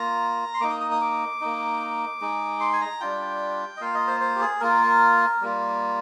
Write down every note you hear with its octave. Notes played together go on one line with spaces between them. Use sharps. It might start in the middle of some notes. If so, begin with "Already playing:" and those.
Already playing: A#3 F4 A#5
C6
A#3 D#4 D6
D#6
D#6
D#6
D6
A#3 D#4
G#3 D#4
C6
G#5
A#5
G3 D4 F4 G5
D#5
A#3 F4 F5
D#5
C5
C5
G4
G#4
A#3 F4 A#4
G3 A#3 F4